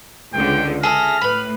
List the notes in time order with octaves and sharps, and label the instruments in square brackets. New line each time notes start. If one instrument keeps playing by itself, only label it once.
[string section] C#2 D3 [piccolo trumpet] G5
[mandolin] G#4 A4 E5 [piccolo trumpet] F6 [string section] A#6
[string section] A2 [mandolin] B4 B5